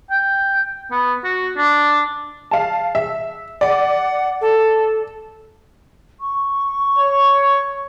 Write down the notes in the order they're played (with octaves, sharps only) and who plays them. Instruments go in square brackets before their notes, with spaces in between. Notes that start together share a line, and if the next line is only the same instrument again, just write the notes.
[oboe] G5
B3
F#4
D4
[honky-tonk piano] F5 A5
E5
[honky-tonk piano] D5 [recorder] F#5
[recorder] A4
[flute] C#6
[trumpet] C#5